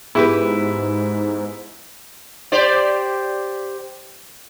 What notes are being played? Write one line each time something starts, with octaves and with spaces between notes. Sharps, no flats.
G#2 B3 D4 E4 F4 G4 G#4 B4
G4 C5 D5